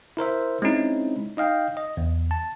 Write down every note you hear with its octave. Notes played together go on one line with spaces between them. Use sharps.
E4 A#4 C5 E5
G#3 C4 C#4 D#4 E4
D#4 D#5 F5 G5
D#5
E2
A5